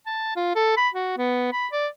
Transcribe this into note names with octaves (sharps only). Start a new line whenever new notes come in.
A5
F4
A4
B5
F#4
B3
B5
D5